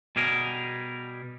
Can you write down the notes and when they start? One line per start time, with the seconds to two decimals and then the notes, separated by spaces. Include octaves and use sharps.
0.16 B2 G3 G#4 A#4